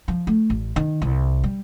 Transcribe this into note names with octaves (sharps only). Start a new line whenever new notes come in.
F3
A3
A1
D#3
C2
G3